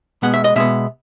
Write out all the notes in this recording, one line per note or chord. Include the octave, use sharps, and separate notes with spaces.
B2 G#3 B3 F#5
E5
D#5
B2 G#3 B3 E5